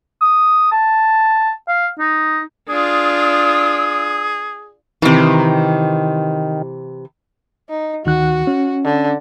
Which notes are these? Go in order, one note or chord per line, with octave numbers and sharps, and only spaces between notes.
D#6
A5
F5
D#4
D4 F4 G#4 D#6
C3 D#3 E3
D#4
D2 D#3 F#4 F#6
C#4
D3